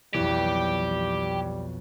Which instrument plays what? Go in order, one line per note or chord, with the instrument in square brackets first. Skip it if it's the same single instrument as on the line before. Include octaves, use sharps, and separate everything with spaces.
[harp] B1 F2 [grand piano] E3 [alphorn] G3 [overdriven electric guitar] G4